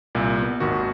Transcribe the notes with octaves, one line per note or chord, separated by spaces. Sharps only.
C2 A#2
B3
G#1 D#2 D#3 F#4